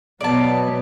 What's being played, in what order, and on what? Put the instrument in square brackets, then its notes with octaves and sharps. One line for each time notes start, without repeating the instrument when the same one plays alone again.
[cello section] B2 F#3 B3 [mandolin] D5 A5